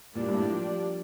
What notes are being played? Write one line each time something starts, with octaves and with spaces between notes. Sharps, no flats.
A#2 G3 A#3 D4 G4 D5
G2
A2
F3